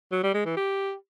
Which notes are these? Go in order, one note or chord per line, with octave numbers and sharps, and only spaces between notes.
F#3
G3
G#3
E3
G4